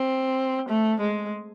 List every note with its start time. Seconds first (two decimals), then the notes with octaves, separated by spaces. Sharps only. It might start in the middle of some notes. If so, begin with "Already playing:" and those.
Already playing: C4
0.69 A3
1.00 G#3